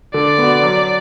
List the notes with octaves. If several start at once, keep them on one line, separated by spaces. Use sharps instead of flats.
D3 D5
B3 F#4
F#3